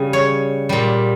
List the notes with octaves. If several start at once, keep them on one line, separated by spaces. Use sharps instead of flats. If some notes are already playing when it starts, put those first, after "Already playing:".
Already playing: C#3 G3
C#5
A#2 G3